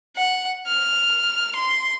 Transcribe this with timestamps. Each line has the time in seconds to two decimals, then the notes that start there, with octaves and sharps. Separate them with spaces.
0.17 F#5
0.67 F6
1.55 C6